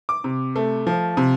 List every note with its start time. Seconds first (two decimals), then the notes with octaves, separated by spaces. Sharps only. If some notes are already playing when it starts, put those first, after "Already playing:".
0.09 D6
0.24 C3
0.56 A3
0.87 F3
1.17 C3